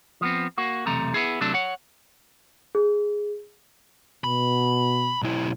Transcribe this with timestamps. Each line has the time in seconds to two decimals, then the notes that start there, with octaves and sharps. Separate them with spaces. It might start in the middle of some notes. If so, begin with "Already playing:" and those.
0.21 F3 B3 C4
0.58 A#3 F#4
0.86 B1 E2 C3 A3 A#5
1.14 B3 E4 G#4
1.41 C3 F#3 A3 D4 A4
1.54 C#5 F#5
2.75 G#4
4.24 B2 B5
5.22 B1 E4